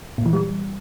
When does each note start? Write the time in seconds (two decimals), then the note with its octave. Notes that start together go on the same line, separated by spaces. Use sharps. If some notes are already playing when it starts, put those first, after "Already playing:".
0.18 A#2
0.26 E3
0.33 G3